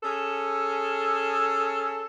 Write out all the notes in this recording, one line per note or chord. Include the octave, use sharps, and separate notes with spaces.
C#4 G#4 A4